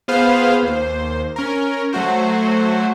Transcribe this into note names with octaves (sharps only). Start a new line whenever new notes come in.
B3 F4 G#4 B4 C5 F5
D#2 C5
C#4 A#4
F#3 A3 F#4 C5